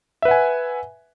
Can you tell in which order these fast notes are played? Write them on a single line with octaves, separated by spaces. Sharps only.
E5 B4 F#5 G#5